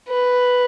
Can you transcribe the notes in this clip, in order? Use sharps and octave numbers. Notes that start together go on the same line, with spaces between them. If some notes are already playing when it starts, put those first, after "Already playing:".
B4